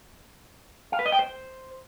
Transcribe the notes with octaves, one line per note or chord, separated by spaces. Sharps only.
F5
B4
D#5
G5
C5